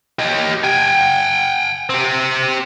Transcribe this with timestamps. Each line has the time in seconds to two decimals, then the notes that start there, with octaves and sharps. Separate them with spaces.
0.19 G4 D#5
0.64 G5 G#5
1.90 C4 G4